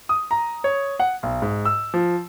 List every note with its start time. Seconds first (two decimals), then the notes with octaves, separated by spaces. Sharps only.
0.09 D#6
0.31 A#5
0.64 C#5
1.00 F#5
1.23 B1
1.42 G#2
1.65 E6
1.94 F3